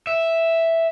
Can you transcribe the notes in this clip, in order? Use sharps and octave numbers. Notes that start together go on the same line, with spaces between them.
E5